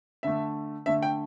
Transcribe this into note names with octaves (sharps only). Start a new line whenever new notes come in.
D3 A3 E5
D3 A3 E5
G5